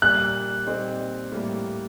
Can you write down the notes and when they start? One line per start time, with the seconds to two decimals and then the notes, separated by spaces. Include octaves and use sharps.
0.02 A#2 G3 A#3 F#6
0.67 A#2 G3 C4 D#4
1.32 A2 G3 A#3